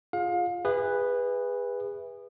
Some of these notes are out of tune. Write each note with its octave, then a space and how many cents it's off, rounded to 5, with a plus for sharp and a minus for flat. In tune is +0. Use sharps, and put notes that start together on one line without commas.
F4 +0 G#4 +0 F5 +30
G#4 -30 B4 +0 E5 +0